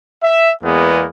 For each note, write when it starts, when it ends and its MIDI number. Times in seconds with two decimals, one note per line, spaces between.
0.23 0.51 76
0.63 1.06 40
0.63 1.06 56
0.63 1.06 58
0.63 1.06 59